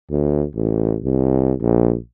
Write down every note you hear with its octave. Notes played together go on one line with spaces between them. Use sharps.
D2
A1
C2
A#1